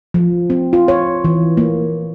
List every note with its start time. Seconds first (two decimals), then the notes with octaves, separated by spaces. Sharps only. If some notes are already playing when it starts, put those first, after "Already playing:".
0.14 F3
0.50 C4
0.73 F4
0.88 C#5
1.24 E3
1.57 A#3